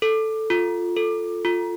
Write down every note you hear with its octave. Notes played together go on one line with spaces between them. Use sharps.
A4
F4
A4
F4